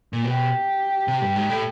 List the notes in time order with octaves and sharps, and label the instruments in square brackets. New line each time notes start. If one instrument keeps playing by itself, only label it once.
[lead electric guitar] A#2
[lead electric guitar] B2 [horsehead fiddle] G4
[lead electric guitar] C3
G2
G#2
A2